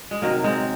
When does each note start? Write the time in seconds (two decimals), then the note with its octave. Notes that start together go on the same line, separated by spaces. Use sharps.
0.11 G#3
0.22 C3 D#3 F#3 A#3
0.44 G#3 C4